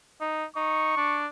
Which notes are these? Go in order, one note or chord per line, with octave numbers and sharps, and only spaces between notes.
D#4
D#4 C#6
D4